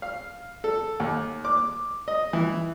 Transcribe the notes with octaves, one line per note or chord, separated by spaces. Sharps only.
F5
A4
D#2
D6
D#5
E3